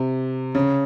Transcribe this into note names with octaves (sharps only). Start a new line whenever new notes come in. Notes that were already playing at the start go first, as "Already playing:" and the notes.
Already playing: C3
C#3